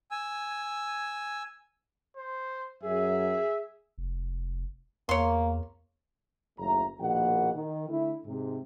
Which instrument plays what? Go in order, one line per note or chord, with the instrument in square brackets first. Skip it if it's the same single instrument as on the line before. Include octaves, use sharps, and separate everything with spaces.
[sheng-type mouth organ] G#5 E6
[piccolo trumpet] C5
[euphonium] F#2 [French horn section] G#4 [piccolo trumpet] E5
[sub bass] F1
[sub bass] E2 [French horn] A#3 [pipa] C#5 C6
[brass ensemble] F#1 D#2 A3 A#5
A#1 D#2 B2 A#3 F#5
D#3
D3 A3 E4
G#2 C3